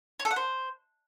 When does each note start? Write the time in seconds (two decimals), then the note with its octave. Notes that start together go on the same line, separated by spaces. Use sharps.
0.20 C#5
0.25 A4
0.31 F#5
0.36 C5